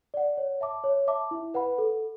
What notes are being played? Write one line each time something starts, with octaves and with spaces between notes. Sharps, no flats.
D5 F#5
C#5
E5 A5 D6
C#5
E5 A5 D6
E4
B4 F#5 B5
A4